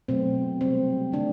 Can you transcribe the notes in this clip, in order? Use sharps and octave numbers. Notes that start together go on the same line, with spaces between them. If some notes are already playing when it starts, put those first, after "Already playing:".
B2 F#3 A3 C4
C3 G3 C4
D3 A3 D4